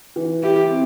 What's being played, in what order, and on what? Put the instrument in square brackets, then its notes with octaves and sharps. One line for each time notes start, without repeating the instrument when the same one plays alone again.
[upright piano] E3
[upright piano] E4 [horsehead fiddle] G4
[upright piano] C4